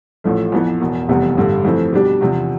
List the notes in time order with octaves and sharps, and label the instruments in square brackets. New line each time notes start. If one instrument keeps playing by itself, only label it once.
[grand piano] A1 A2 F3 A3
F2 E3 B3
E1 E2 B2
F1 E2 C3 G3 B3
A1 G2 D3 G3
F2 E3 A3 C4
B2 G3 D4 G4
E2 C3 F3